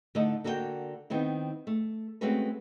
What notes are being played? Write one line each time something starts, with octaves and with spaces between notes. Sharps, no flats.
D3 A3 D#4 E4 A4 D#5
D3 A#3 F#4 A4 C5 G5
D#3 B3 C4 E4
A3
G#3 A3 C4 C#4 F#4 B4